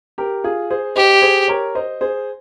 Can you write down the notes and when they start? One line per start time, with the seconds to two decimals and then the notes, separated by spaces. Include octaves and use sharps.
0.18 G4 A#4
0.44 F4 G#4
0.70 G#4 C5
0.96 G4 C5 D#5
1.22 G#4 C5
1.48 A#4 C#5
1.75 C5 D#5
2.01 G#4 C5